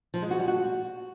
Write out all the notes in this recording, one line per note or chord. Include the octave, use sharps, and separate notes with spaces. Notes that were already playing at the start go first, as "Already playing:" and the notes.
F3
G#3
F#4
G3
F#4